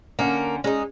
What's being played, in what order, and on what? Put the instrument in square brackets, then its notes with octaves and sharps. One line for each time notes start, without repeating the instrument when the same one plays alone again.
[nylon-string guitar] D3 C#4 F#5 [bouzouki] A#3
[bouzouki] G#3 D#4 [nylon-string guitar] C#4